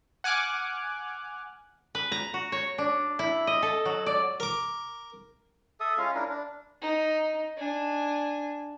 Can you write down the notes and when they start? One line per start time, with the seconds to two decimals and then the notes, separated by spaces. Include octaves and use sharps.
0.24 F#5 G#5 D6 F6 F#6
1.95 B4
2.12 A#5
2.34 F#4
2.52 C#5
2.78 D4
3.19 E4
3.47 D#5
3.63 A4
3.85 F#3
4.06 D5
4.40 A#4 D6
5.80 A4 E5 D#6
5.98 G#3 C#4 F4 F5
6.15 D4 E4 A#4
6.29 D4
6.82 D#4
7.57 D4 G#5